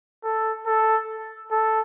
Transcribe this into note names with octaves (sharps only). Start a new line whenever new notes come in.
A4
A4
A4